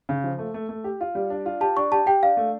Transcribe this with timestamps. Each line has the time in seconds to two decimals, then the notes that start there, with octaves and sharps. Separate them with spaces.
0.09 C#3
0.24 F3
0.39 A3
0.54 A3
0.69 A3
0.84 G4
1.01 F4
1.15 G3
1.30 D4
1.46 F4
1.61 G4 A5
1.77 D4 C#6
1.92 G4 A5
2.06 G4 G5
2.23 D4 F5
2.37 A3